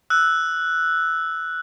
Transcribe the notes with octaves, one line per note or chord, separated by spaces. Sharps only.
E6 F#6